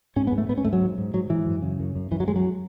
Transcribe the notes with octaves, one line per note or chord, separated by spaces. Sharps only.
G#2 C#4
B3
G#2
A3
G#2 B3
C#4
G#2 A3
F#3
G#2
G#2
G#2 F#3
G#2 E3
F#2
C#3
F#2
F#2
F#2 E3
F#3
F#2 G#3
F#3